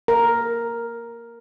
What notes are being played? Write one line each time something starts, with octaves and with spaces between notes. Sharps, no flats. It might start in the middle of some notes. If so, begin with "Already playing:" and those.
A#4